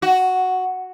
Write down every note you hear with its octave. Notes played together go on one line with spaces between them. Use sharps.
F#4